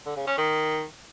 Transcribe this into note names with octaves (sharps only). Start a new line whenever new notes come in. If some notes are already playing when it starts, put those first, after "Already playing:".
D3
C#3
C#4
D#3